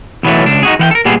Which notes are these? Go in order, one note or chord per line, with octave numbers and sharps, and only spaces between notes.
B1 E3 F#3 A3
C#2 D4
D#4 F#4 G#4
E3 F#5 G5
A4 A#4
A#2 G3 B3 D4 G4 G#4